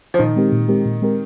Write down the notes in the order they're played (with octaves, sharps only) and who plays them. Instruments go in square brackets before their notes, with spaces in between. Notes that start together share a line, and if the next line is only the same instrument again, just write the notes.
[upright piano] F3
[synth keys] A#2 [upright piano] D#3
[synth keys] G#3 C4 G4 A#4
A#2
G#3 C4 G4 A#4
A#2
G#3 C4 G4 A#4